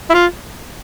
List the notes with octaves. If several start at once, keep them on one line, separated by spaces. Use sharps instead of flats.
E4
F4